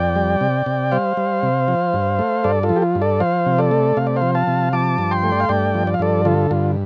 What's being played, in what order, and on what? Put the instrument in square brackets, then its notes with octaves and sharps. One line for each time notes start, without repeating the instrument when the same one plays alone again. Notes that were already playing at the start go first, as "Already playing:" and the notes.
Already playing: [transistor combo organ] F2 D5 G5
G3
C3
C3
G3 C5 F5
G3
C3
F3
G2
A3
G2 A4 D5
F4 A4
F3
G4
F4
G2
A4 D5
F3 C5 F5
C3
A4 D5
A3
C3 F5
D5
C5 F5
F3
F5 A5
C3
F3 A5 D6
G2
G5 C6
A3
D5
F5
G2 D5 G5
F3
D5
F5
G2 A4 D5
D3 F4 A4
G2 F4